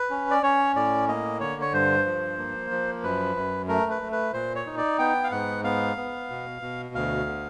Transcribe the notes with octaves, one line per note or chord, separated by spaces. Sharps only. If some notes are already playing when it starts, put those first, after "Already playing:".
Already playing: B4
C#4
D5
C#4 C#5
A2 D5
A#3 D#5
D3 C#5
C#5
G2 C5
F3
A#3
F3
F#2 B4
F#2
A3 A#4
B4
A3
B4
A#2 C5
C#5
D#4
D5
B3 G5
F5
G#2 F#5
B3 F5
B3
B2
B2
D2 F5
D3